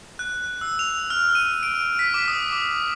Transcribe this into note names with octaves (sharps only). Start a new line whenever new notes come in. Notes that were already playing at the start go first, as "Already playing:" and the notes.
F#6
E6
F7
F6
D#7
D7
B6
D6
D#6
D6